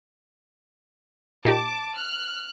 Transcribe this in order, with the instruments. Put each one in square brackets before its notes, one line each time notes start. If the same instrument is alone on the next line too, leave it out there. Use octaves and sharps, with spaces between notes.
[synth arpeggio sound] A#2 D#4 G4 [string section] A5 D6
[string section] F6 F#6